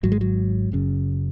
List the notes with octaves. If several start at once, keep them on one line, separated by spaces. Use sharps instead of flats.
G#1 G#2 F#3
G#3
F#3
F#1 F#2 C#3